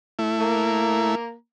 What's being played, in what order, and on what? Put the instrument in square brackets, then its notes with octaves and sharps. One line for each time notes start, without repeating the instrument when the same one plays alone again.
[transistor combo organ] A3 E4
[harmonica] A#3 A#5